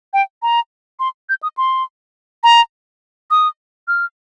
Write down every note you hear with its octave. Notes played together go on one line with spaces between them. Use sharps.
G5
A#5
C6
G6
D#6
C6
A#5
D#6
F6